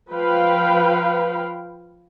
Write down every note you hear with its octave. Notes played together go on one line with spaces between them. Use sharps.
F3 B4 F5 G5 B5